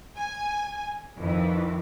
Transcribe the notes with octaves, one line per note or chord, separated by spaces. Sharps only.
G#5
F2 D#3 E3